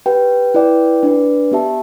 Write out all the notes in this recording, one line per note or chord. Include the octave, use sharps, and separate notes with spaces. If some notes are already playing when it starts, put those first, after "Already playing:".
G4 B4 G5
E4 B4 D5 G5
D4 B4 D5
B3 G4 E5 A5